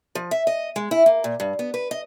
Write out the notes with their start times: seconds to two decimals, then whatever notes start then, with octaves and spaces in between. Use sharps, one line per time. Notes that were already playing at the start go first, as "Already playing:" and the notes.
0.15 F3
0.31 E5
0.47 D#5
0.76 G#3
0.91 E4
1.06 A#3
1.24 A#2
1.40 G2
1.59 B3
1.74 B4
1.91 D#5